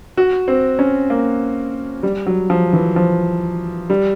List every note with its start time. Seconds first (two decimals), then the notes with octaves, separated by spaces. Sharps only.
0.17 F#4
0.48 C4
0.79 C#4
1.10 A#3
2.03 G3
2.26 F#3
2.50 F3
2.73 E3
2.96 F3
3.90 G3